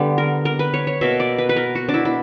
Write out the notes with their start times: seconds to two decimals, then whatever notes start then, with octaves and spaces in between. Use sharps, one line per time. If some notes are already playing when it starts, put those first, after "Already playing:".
Already playing: D3 G3 B3
0.18 A#4
0.45 A#4
0.59 B4
0.74 C#5
0.87 C#5
1.01 B2 A#3 E5
1.20 D5
1.38 B4
1.49 B4
1.56 A#4
1.75 F#4
1.89 D4
1.94 E4
2.05 E4